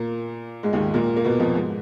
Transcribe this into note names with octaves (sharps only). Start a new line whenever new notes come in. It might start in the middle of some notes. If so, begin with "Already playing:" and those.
Already playing: A#2 A#3
G#2 G#3
D#2 D#3
A#2 A#3
A#3
B2 B3
F2 F3
G#2